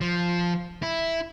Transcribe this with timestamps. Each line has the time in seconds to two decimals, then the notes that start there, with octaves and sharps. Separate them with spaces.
0.01 F3
0.82 E4